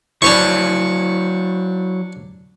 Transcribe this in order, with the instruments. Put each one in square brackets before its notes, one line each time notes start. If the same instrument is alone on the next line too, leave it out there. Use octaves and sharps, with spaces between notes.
[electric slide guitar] F#3 E4 C5 [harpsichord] D4 C#5 C#6